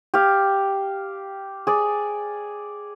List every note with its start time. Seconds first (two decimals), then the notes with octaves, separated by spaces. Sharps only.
0.14 G4 F5
1.67 G#4 D5